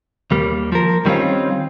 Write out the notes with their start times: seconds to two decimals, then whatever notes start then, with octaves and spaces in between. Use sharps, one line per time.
0.31 D#2 G3 A#3
0.72 F3 A#4
1.05 D#3 G3 C4 C#4 F4